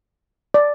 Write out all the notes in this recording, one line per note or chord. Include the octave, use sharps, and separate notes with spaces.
D5